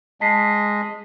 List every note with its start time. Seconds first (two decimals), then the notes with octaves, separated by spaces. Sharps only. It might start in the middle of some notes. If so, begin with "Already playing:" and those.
0.21 G#3 D#5 A5 B6 C7